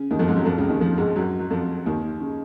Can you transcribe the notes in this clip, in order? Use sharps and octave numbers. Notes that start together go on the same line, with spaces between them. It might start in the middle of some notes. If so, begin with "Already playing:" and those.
Already playing: C#3 C#4
D#2 D#3
F2 F3
G#2 G#3
F#2 F#3
F2 F3
C#2 C#3
D#2 D#3
F2 F3
G#2 G#3
F#2 F#3
F#3
F2 F3
D#2 D#3
C#3